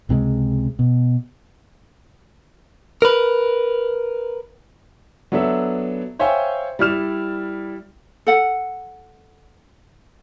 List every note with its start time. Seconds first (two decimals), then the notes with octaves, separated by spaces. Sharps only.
0.09 C#2 C3 F3 G#3
0.79 B2
3.02 A#4 B4
5.32 F#3 B3 D4 A4 E5
6.19 C5 C#5 E5 F5 G5 G#5
6.79 G3 E4 D5 F6 E7
8.27 A4 F#5